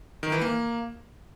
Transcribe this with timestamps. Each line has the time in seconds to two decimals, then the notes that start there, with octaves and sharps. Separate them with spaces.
0.23 D#3
0.32 E3
0.41 A#3